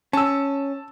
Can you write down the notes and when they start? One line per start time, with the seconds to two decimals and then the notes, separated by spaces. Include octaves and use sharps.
0.13 C#4 A5 E6